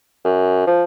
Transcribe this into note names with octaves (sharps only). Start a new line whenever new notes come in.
F#2
F3